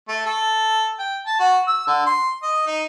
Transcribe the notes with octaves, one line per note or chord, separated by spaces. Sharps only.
A3
A4
G5
A5
F#4
E6
D3
C6
D#5
D#4